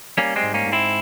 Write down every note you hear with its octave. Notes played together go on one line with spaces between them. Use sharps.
G3 A#3 C#4
G#3 C4
G#2
A#3 C#4
G#2
C4 E4